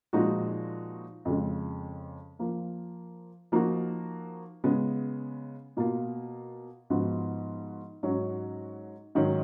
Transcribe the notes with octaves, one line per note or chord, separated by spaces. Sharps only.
A#2 F3 G#3 D#4 F#4
F2 C#3 G#3
F3 A#3 F4
F3 A#3 D#4 F#4
C#3 G#3 B3
B2 A#3 F4
G#2 F3 B3 F#4
G#2 F#3 C#4 F#4
G#2 D#3 F#3 C#4